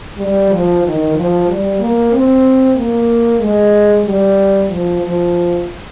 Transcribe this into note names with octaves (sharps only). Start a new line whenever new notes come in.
G3
F3
D#3
F3
G3
A#3
C4
A#3
G#3
G3
F3
F3